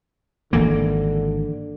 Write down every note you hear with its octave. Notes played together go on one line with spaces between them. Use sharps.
G#1 D3 E3 A#3